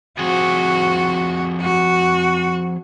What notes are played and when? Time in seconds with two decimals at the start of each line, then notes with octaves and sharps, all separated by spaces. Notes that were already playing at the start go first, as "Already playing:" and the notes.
0.19 F3 C4 F#4 G#4
1.61 F#4